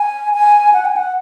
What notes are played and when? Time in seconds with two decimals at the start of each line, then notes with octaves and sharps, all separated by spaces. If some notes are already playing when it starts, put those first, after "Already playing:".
Already playing: G#5
0.34 G#5
0.74 F#5
0.85 G#5
0.96 F#5